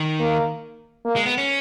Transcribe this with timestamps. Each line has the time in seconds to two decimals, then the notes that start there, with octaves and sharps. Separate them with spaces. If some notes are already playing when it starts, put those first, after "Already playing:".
Already playing: D#3
0.20 A#3
1.05 A#3
1.16 G#3
1.26 B3
1.38 C#4